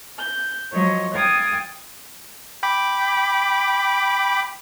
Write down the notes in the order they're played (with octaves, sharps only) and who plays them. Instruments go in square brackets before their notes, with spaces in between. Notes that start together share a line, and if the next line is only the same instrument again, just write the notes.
[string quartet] G6
F3 F#3 C#5 D#5
F5 G5 D#6 G#6 A6
[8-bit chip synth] G5 B5 D6